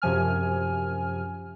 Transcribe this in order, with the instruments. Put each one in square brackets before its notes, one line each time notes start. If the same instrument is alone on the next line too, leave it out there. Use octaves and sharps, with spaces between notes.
[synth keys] F#2 C3 F3 G#5 F6